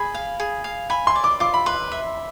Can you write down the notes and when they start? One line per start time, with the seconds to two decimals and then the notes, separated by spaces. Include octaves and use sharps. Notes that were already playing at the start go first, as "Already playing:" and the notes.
Already playing: G#4 B5
0.14 F5
0.40 G#4
0.64 F5
0.90 G#5 B5
1.07 C6
1.15 D5
1.24 D6
1.40 F4 D6
1.54 B5
1.66 B4 C6
1.92 E5